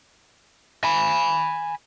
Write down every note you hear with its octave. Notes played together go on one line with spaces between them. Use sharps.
G#5 B5